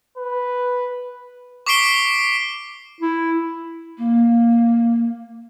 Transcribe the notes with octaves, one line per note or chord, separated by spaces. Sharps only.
B4
C#6 D6 B6 C7 D7 G7
E4
A#3